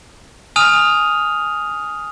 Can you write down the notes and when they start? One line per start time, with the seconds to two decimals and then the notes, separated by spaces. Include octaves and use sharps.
0.56 G#5 D#6 F6 D#7 F7